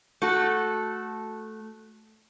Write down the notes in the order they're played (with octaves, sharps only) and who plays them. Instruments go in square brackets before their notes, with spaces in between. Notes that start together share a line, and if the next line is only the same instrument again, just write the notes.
[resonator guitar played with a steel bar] A3 F#4 A4